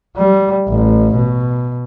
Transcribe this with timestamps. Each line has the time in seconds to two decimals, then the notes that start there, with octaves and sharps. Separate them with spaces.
0.17 G3
0.68 A1
1.14 B2